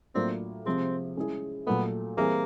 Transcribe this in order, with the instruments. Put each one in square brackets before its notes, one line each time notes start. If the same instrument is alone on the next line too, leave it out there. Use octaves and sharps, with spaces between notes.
[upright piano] A2 F#3 A#3 D4 F4 [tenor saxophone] C4
[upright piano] C3 F3 G#3 [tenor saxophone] C4
[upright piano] G#3 C#4 E4 G#4
[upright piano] A#2 F#3 A3 [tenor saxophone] B3
[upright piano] E3 G3 C4 E4 G#4 [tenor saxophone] A#3